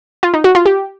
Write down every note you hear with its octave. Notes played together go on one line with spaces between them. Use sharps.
F4
D#4
F#4
F4
G4